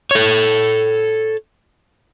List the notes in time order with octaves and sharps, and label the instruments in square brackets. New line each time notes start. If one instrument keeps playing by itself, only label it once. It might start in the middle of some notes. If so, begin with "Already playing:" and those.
[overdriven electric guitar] A4 C#5